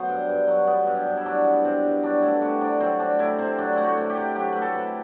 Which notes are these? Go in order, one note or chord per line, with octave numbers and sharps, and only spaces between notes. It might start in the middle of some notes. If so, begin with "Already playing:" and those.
Already playing: F#3 B3 C5
G2
G2
F#3
B3
G2
G2
E4
F#3 D4
B3
G2 C4
G2
F#3 D4
A3 E4
C3 F#4
C3 D4
F#3 C4
A3 D4
C3 E4
C3 C4
F#3 D4
A3 E4
F#4
C3
G4
C3
F#3 G4
A3 B4
A4
C3